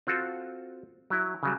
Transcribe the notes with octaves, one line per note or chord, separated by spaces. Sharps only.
C4 F4 F#4 A4
F#3 E4
C#3 F#3 G3